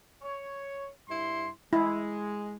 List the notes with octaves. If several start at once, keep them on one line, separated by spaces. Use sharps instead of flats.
C#5
G2 E4 C6
G#3 E4